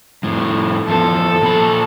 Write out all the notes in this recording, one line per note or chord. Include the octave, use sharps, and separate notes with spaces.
F2 A2
E2 F3 A4
A#2 B5